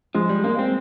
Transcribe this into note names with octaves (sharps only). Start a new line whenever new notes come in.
F3 G#3
G3
G#3 A#3
C4